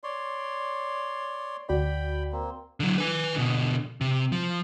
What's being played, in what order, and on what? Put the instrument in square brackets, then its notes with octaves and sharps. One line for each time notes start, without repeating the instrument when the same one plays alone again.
[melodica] C#5 D5 C6
[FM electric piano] D2 F#4 D5 [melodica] G5 B5
[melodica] A#3 C4
[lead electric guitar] D3 F#3
B4 G#5
B2 D3
C3
F3